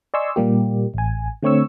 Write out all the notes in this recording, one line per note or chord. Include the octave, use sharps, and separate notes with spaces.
D5 D#5 G#5 C6 C#6 E6
A#2 G3 A#3 G4
A1 G#5
D3 A3 C4 C#5 C#6 E6